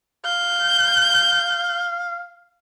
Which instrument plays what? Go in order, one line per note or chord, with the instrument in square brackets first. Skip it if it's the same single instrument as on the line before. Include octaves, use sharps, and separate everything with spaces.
[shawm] F5 [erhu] G6